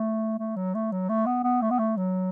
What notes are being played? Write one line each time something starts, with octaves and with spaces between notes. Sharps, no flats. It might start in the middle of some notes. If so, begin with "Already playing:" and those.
Already playing: A3
A3
F#3
A3
F#3
A3
B3
B3
A3
B3
A3
F#3